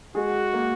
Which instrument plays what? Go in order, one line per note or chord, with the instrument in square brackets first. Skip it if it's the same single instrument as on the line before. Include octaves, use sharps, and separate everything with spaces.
[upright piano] G#3 G#4 [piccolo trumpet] F#4
[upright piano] A#3